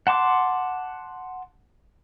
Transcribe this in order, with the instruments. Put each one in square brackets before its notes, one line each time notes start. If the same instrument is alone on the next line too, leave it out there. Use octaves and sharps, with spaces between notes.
[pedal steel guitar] F#5 A5 C6 D6